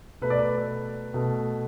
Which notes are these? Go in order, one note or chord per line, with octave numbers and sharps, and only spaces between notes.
B2 A3 B4
D5
B4
B2 A3